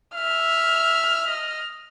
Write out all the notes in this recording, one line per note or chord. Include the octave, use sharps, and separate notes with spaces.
E5 F6
D#5